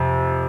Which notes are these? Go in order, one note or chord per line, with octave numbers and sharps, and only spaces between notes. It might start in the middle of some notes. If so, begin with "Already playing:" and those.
Already playing: F2 C3